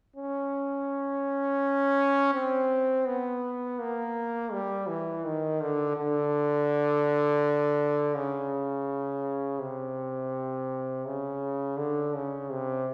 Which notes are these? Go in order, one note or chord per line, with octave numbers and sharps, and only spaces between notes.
C#4
C4
B3
A#3
G3
E3
D#3
D3
D3
C#3
C3
C#3
D3
C#3
C3